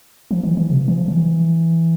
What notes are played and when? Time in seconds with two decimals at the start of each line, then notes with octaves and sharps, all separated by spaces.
0.31 F3
0.44 E3
0.57 E3
0.70 C3
0.88 E3
0.96 F3
1.08 E3